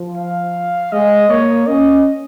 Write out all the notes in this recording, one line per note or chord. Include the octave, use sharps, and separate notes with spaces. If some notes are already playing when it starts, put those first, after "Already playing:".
Already playing: F3
F5
G#3 D#5
A#3 C#5
C#4 D#5